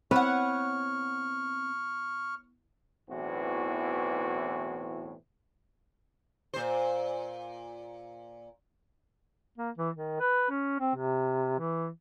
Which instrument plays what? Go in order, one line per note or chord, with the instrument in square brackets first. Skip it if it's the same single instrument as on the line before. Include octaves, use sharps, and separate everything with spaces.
[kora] B3 E4 B4 [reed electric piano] C4 [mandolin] C#5 F#5 [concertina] C#6 F6
[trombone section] B1 E2 A2 E3 C4 F#4
[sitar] A#2 C5
[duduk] A#3
E3
D#3
B4
C#4
C4
C3
E3